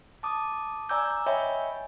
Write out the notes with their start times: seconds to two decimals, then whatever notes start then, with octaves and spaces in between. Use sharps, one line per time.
0.23 A5 D6 D#6
0.89 D5 G#5 A#5 D6 E6 G6
1.11 G6
1.26 C#5 D#5 E5 G5 G#5 B5